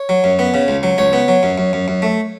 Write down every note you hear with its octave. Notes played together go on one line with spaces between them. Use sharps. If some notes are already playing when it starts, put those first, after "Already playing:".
Already playing: C#5
F#3
F#2
B3
C#3
C#2
F#3
C#2 C#5
B3
F#3
F#2
F#2
F#2
F#2
A3